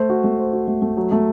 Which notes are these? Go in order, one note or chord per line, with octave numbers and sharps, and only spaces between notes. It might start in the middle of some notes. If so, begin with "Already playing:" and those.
Already playing: A3 C5
F#4
A3
C5
F#4
A3
A3
F#3
A3